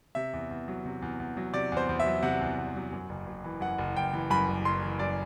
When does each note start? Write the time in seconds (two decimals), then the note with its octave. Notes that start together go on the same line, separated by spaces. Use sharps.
0.15 C3 E5
0.33 E2
0.51 E2
0.68 F#3
0.85 C3
1.02 E2
1.20 E2
1.37 F#3
1.53 C3 D5
1.72 E2 C5
1.89 E2
2.00 E5
2.06 F#3
2.22 C3 F#5
2.41 E2
2.58 E2
2.75 F#3
2.93 F#2
3.09 F#1
3.26 F#1
3.44 E3
3.61 F#2 F#5
3.78 F#1
3.96 F#1 G5
4.13 E3
4.30 F#2 B5
4.48 F#1
4.65 F#1 C6
4.82 E3
4.99 F#2 D5